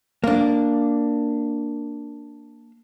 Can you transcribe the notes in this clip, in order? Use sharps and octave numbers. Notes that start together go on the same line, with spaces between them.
A#3 D4